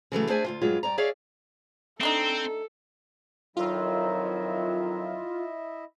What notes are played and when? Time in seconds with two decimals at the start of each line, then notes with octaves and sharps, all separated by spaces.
0.12 C#3 E3 F#3 A3
0.29 D4 G#4 C5 D5 E5 G#5
0.44 D2 C#3 F4
0.61 G2 F#3 G#3 F4
0.83 G2 D5 A#5
0.98 G#4 C#5 D5 E5 F5
2.01 A3 C4 D4 D#4 A4
3.57 F2 D#3 F#3 E4 F4 D#5 E5